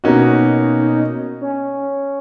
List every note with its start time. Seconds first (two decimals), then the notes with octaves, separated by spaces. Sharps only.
0.04 B2 A#3 C#4 D#4 F#4
1.41 C#4